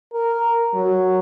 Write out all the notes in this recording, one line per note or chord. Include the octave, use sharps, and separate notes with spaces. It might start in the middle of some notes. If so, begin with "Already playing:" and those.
A#4
F#3